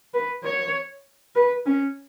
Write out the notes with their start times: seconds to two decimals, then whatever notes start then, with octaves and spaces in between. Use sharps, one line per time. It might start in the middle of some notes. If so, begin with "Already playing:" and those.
0.14 B4
0.44 C#5
1.35 B4
1.66 C#4